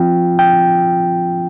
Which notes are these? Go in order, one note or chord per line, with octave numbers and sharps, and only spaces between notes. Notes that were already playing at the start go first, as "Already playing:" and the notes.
Already playing: F3 C4 F4 G5
G5